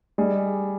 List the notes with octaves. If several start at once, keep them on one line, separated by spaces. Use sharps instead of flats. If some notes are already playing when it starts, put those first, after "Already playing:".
G3 D4 G#4 D#5